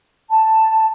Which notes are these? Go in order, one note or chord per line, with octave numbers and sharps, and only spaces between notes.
A5